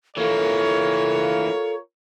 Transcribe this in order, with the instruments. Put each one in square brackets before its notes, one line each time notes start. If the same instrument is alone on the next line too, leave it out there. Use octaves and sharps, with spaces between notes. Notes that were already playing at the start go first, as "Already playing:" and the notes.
[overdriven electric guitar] E3 A#3 [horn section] F4 A#4 C#5 [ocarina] A4